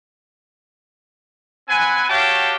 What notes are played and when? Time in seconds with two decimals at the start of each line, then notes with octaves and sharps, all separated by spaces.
1.69 C4 B4 F#5 G#5
2.09 F#4 G4 C#5 F5 G5 A5